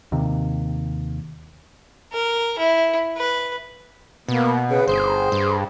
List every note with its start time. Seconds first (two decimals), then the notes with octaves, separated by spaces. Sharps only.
0.12 D#2 C3
2.13 A#4
2.58 E4
3.17 B4
4.29 B2 A#3 B3
4.69 C#3 B4
4.88 G1 G#4 C5
5.32 G2